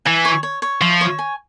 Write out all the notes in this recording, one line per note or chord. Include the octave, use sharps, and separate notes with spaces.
E3 G#5
C#5
C#5
C#5
F3 E5
C#5
G#5